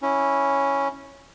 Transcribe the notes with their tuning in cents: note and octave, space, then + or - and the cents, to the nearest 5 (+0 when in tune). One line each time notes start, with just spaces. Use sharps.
C#4 +0 E4 -10